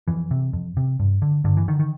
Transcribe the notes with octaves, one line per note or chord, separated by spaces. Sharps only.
F2 E3
C3
F2
C3
G2
D3
G2 D3
E3
D3 D#3
D#3